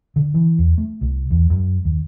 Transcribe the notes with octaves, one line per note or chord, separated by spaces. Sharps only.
D3
E3
E2
A3
C2
E2
F#2
D#2